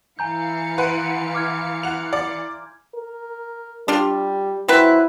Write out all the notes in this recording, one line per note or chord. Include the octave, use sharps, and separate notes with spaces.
E3 F5 G#5 A#5 G6 C#7
B4 F#5 G#5 C6 D7
D6 F6 G#6
F#5 F7
D5
A#4
G3 D4 F4
F#3 C4 E4 B4